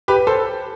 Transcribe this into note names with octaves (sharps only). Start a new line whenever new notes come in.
G4 B4
A4 C5